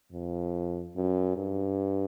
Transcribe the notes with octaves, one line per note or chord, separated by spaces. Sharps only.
F2
F#2
G2